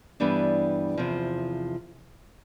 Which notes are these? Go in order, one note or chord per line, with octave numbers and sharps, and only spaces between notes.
G2 E3 G3 B3 D4
E2 C3 F3